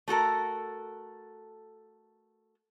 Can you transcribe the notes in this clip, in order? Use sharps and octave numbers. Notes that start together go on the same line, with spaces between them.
A3 F#4 A4 A#4